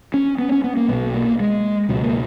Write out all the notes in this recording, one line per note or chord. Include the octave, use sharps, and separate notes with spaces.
C#4
B3
C#4
B3
A#3
B1 B2 B3
A#3
G#3
C#2 B2 F#3
A#3